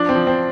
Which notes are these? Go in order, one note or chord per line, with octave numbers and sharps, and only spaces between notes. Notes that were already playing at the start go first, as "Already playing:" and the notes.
Already playing: F3 D4
C4
F3
C4